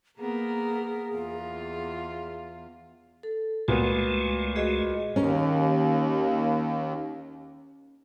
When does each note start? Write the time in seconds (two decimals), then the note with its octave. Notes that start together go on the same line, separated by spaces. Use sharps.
0.18 A#3 B3 G#4 A#4
1.16 E2 F4
3.23 A4
3.68 C#2 A#2 G#3 A3 B3 F#4
4.56 F#4 G#4 D#5
5.16 D#2 C#4 A#4